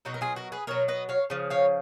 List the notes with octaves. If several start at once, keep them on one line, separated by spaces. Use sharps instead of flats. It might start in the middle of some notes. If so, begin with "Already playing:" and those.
B2 F#3 D#4 F#4
A#4
F4 G#4
F#4 A#4
G#4 B4
B2 F#3 A#4 C#5
B4 D#5
C#5 F5
C#3 F3
C#5 F5